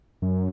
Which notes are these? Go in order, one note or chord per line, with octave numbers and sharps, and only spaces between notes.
F#2